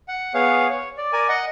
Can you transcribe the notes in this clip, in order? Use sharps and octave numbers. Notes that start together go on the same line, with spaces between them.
F#5
B3 G#4 C#5 F5
C#5
D5
A#4 D5 G#5
D#5 F#5